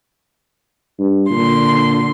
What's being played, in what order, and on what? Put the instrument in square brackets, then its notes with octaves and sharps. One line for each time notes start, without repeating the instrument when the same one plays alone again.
[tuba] G2
[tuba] A#2 [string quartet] D3 C6